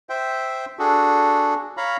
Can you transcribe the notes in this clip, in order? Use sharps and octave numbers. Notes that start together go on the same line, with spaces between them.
C5 E5 G5
D4 F#4 G#4 A4
C#5 F5 A#5 B5